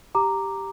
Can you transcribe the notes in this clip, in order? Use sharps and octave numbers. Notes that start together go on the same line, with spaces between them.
G4 A#5 D6